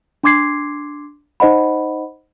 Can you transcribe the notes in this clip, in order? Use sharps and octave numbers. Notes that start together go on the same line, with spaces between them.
D4 C6 D6 G#6 C7
D#4 C5 D#5 F#5 B5